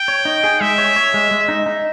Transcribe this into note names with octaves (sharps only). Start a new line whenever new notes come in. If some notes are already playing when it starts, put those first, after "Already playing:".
Already playing: G5
C#5
D#4
G#4
G#3 E5
C#5
C#5
G#3
G#3
D#4
D#4